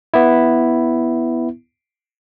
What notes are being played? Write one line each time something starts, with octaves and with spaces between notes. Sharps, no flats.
B3 E4